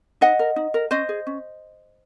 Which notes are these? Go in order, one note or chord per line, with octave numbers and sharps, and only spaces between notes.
D#4 D#5 F#5
A#4
D#4
A#4
C#4 C5 D#5
G#4
C#4